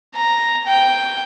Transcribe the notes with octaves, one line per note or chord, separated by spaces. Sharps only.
A#5
G5